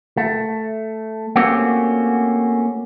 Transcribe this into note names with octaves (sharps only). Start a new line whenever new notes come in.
A3
A3 A#3 C4 C#4 F#4 G4